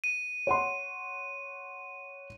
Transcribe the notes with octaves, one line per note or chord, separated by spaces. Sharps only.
D#7
C#5 F#5 C6